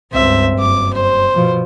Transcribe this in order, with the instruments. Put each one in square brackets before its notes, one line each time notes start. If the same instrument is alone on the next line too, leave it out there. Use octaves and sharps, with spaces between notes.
[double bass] C#2 G2 [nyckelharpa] C4 E5
[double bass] F#1 [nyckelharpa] D6
[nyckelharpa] C5
[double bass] B2 F3